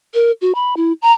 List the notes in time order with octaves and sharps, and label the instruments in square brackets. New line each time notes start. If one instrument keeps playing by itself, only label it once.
[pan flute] A#4
F#4
B5
E4
A#5